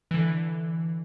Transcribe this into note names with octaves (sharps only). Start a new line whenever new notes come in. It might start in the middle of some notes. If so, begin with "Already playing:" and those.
D3 E3